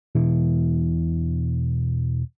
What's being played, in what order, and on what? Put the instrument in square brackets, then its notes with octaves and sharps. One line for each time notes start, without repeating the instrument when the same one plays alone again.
[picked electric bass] E1 B2 E3